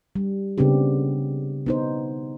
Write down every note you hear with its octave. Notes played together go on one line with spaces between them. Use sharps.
G3
C#3 B3 C4 D4 G4
B3 D#4 C5